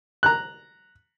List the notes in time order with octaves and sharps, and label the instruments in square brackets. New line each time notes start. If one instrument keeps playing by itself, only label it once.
[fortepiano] A#5 F#6